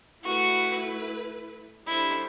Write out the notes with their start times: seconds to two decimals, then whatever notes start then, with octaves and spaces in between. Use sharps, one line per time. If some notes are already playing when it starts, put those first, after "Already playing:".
0.24 A3 E4 F#4 B4
1.87 G3 D4 E4 A4 C5